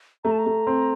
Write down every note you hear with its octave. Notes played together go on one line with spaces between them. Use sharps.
A3 A#5
A5
A#5
A3
C4